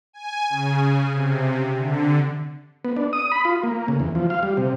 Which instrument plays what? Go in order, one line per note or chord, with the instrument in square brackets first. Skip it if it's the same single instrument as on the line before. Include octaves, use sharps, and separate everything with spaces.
[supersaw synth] G#5
C#3
C3
D3
[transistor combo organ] B3
D4
D#6
B5
F4
A#3
C#3
E2
F3
F5
G3
C3